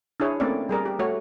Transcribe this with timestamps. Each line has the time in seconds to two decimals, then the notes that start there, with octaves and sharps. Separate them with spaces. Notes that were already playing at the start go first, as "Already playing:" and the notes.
0.20 D4 E4 G#4 C#5
0.40 A3 A#3 C4 C#4 D5
0.69 G3 G#4 A#4 D5
0.85 G4
0.99 A3 F#4 C#5